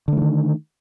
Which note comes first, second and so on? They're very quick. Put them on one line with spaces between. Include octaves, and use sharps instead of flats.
D3 A3 F3 D#3